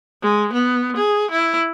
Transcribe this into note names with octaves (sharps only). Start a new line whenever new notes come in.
G#3
B3
G#4
E4